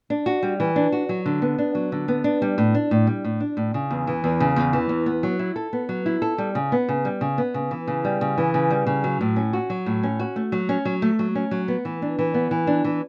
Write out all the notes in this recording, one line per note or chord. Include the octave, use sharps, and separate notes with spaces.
D4
F#4
G3
E3
D4
F#4
F#3
D3
B3
D4
F#3
D3
B3
D4
G3
A2
D4
A2
G3
A2
D4
A2
C#3
E2
E3
E2
C#3
E2
E3
E2
B3
F#3
E4
A4
B3
F#3
E4
A4
G3
C#3
B3
C#3
G3
C#3
B3
C#3
E3
C#3
G3
C#3
E3
C#3
G3
C#3
F#3
A2
C#4
F#4
F#3
A2
C#4
F#4
A3
F#3
C#4
F#3
A3
F#3
C#4
F#3
B3
E3
D4
E3
B3
E3
D4
E3